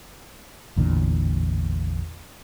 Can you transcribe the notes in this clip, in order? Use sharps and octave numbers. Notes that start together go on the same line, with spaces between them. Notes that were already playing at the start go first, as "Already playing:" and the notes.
A1 E2 A#2 D3